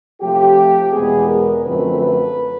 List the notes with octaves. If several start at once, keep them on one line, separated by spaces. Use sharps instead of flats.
C3 F3 A3 G4
E2 B2 G#3 B3 G#4
A#4
F#2 D3 F3 A3 C4 B4
B4